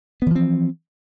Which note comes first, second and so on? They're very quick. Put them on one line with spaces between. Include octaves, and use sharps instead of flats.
B3 E3 F3 C4